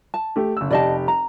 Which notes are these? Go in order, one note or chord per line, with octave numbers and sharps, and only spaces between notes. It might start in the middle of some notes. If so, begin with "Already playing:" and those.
A5
A3 G4
F#1 E6
F1 G4 D5 D#5 A5
A#5